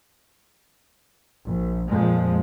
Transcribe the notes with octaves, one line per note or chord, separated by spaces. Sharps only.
A#1
F2 A#2 F3 G#3